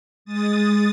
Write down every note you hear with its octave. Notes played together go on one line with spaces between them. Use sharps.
G#3 D#6 A6